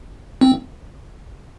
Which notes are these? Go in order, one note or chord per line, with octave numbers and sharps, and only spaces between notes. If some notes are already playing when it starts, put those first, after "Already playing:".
C4